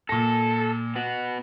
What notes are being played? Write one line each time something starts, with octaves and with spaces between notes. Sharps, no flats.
A#2 A4 A#6
B3 F#4